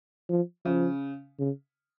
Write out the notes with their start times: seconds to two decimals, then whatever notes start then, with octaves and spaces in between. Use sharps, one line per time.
0.29 F3
0.65 C#3 F3
1.39 C#3